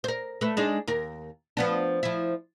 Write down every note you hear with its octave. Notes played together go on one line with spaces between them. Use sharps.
A#4 C5
A3 B4
G#3 D4 D#4
D#2 A#4
F3 B3 D4
F3 E4